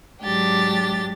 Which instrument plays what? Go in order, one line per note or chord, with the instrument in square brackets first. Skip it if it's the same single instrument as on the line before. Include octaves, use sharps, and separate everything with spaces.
[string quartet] G#2 F#3 G#3 D4 G4 A6